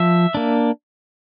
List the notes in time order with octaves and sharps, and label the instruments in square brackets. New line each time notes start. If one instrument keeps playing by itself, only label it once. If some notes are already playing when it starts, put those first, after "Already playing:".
Already playing: [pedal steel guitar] F3 E5
A#3 D4